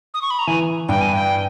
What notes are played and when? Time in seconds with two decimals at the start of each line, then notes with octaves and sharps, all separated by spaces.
0.14 D#6
0.22 C#6
0.31 B5
0.39 A#5
0.47 E3 G#5
0.88 G2 G5
1.01 G#5
1.14 G5